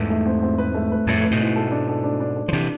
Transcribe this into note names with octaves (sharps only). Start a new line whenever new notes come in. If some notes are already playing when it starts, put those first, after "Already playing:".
Already playing: E2 G#2 A3 B4
A3
C4
C4
B4
A3
B4
F2 A2 A3
B4
G#2 B2
E4
A4
D4
A4
D4
D4
A4
F3
C3 E3 D4